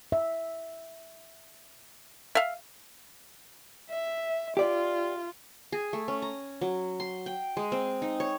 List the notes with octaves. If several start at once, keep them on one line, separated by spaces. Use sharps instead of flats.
E5
E5 F5
E5
F4 G4 D5
G#4
A3
C#4
A#5
F#3
C6
G5
G#3
C4
D#4
C#5